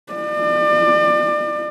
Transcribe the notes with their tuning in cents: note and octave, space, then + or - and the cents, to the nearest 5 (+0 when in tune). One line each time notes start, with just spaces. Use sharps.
D5 +35